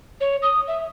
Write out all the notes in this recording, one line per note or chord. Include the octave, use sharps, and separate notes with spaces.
C#5
D#6
E5